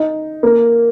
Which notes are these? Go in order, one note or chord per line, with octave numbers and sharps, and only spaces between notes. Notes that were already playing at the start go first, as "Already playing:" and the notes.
Already playing: D#4
A#3